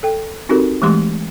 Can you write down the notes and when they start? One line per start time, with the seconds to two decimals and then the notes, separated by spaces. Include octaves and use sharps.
0.03 A4 G5
0.49 C4 D#4 F#4 G4 A4 A#4
0.82 E3 G#3 A3 G4 C6 D6